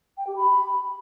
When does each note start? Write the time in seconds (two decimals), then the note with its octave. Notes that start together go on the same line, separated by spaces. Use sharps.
0.17 G5
0.27 G4
0.36 B5